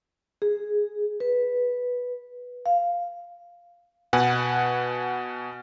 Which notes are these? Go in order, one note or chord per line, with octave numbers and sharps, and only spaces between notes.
G#4
B4
F5
B2 B4 F#5 G#5